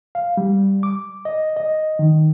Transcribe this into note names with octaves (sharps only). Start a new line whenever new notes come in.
F5
G3
D6
D#5
D#5
D#3